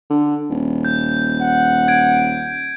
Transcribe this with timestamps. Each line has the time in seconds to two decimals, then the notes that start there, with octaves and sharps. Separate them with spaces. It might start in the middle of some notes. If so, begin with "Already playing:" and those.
0.10 D3
0.50 D#1
0.84 G6
1.42 F#5
1.88 G#6 D7